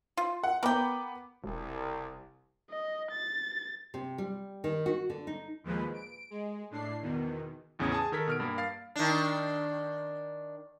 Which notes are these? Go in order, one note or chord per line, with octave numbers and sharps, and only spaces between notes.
F4
F#5
B3 A#4 G5 B5 D6
E1 C2
D#5
A6
C3
G3
D#3
F#4
D3
D#4
D#2 A#2 F3 G#3 B4
D7
G#3
A2 D4 C7
E2 B2 D#3
A1 E2 C#3 C#4 D#6 G#6
G#4 G#5 A5 D#6
D#3 A4 A#4 G#6 B6
B2 F6 D7
G2 A#3
F5 A6 C7
D#3 D4